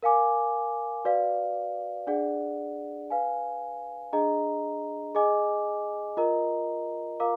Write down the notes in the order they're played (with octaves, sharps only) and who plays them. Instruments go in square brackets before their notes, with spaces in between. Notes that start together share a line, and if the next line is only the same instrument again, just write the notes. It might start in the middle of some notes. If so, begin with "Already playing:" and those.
[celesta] A#4 F5 G#5 D6
F#4 B4 D5 F5
D4 G#4 D5 F#5
B4 F5 G#5
D4 G#4 D#5 A#5
G#4 D#5 G#5 D6
F4 A#4 D#5 A#5
F4 A#4 F5 A#5 D6